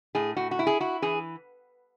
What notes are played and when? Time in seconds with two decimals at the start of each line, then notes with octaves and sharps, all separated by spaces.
0.15 A2 G#4
0.36 A2 F#4
0.51 F#4
0.59 E4
0.67 G#4
0.80 E4 F#4
1.02 E3 G#4